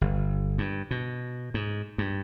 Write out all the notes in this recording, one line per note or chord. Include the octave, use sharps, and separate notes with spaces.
G1
G2
B2
G#2
G2